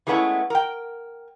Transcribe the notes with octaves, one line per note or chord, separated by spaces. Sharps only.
E3 G#3 A3 B3 C#4 E4
A#4 G5